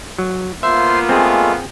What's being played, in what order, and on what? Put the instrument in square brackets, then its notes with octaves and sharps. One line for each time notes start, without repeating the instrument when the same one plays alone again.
[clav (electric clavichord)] F#3
[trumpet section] A#3 B3 F4 [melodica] C5 C6 [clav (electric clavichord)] E5
[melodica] G#3 A3 [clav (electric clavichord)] C4 G#4